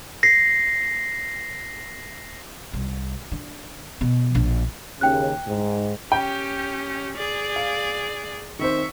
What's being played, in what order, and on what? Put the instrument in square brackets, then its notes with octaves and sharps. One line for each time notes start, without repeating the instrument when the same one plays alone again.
[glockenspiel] A#6 C7
[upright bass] C2
D3
B2
A#1
[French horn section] D#2 C#3 [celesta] G5 F#6
[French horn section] G#2
[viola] C#4 G4 [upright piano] G5
[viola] G#4 D5
[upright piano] F5
[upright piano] D#3 C4 C5 [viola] E5 C#6